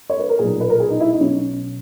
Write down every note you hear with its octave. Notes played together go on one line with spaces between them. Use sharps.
C#5
B4
A#4
B1 A#2 G#4
B4
A#4
G#4
D#4
E4
D#4
B1 B2 C#4